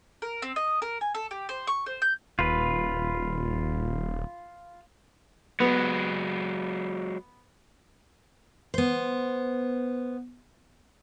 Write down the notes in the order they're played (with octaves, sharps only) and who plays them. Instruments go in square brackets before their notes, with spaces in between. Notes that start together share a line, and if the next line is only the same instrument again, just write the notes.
[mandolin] A#4
C4
D#5
A#4
G#5
A4
G4
C5
C#6
C5
G6
[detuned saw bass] D#1 [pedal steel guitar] F4 B4
[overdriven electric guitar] F#3 G#3 [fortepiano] B3
[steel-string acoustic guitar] B3 C5